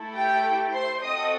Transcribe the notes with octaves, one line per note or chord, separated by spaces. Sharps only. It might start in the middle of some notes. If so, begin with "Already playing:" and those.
Already playing: A3 E4 A4
G4 G5
C5 C6
C4 F#4 A4 D#5 D#6